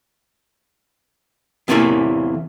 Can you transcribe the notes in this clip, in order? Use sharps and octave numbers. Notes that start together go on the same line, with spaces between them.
E2 C3 E3 F#3 A3 A#3